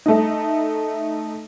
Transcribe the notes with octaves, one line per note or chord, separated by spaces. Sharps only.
A3 D#4